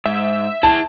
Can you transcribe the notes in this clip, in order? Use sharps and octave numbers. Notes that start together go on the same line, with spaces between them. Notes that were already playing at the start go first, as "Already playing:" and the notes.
G#2 E5
E4 G#4 A5